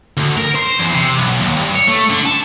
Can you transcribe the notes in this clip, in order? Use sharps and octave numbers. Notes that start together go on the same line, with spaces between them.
D2
A#4
C5
E2
C3
B1
D#2
G2
C#5
A3
D3
A5